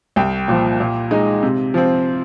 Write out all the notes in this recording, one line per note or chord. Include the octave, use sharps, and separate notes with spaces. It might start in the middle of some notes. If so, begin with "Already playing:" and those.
C2 G5
A#2 F3
A#2
G#3 D#4
C3
F3 C4